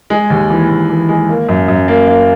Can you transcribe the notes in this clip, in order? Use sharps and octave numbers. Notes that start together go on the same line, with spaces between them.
G#3
D#2
E3
D#2
E3
G#3
A#3
F#2
F#2
A#3
A#3